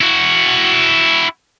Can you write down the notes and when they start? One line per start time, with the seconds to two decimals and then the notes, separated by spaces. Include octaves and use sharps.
0.01 E4 F#4